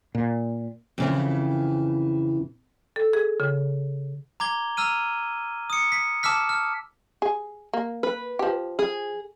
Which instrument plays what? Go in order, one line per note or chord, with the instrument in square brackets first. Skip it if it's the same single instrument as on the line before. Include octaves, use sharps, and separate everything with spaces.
[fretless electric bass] A#2
[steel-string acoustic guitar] F2 C#3 E3
[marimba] A4
G#4
C#3
[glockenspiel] A#5 D6 G#6 G7
A#5 E6 F6 D#7
D#6 C#7
B6
A5 D6 E6 F6 B6
F6
[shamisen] G#4
A#3
[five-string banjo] B4
[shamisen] F3 G4
[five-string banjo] G#4